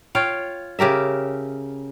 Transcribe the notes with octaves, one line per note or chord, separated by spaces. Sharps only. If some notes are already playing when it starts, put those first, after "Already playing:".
F4 C#5 F5 G5
C#3 G4 A#4 E5